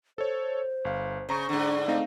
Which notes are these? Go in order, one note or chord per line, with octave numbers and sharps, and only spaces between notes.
A4 C5 C#5
G1 F5
C#3 C5 A#5 C#6
G#2 D3 D4
A3 C4 D#4 F5